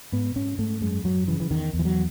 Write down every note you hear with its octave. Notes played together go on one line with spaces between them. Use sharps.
G#2 B3
G#2 C#4
G#2 A3
F#2 G#3
F#2 F#3
C#3 E3
E3
E2 D#3
E2
E3
F#3